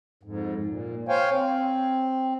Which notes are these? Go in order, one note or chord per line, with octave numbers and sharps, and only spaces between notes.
F2 G#2
A#2
C5 C#5 F5 G5 G#5
C4